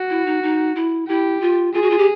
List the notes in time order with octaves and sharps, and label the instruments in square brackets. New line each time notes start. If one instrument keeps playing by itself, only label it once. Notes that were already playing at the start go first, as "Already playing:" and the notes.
Already playing: [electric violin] F#4
[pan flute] E4
D#4
D#4
E4
[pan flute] E4 [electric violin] G4
[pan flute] F4
[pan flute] F4 [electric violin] G#4
[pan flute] F#4
F4
G4